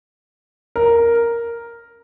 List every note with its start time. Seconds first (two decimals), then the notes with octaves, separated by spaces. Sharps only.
0.76 A#4